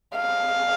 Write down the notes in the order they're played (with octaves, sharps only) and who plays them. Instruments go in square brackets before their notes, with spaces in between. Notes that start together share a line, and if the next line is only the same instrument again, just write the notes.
[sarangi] F5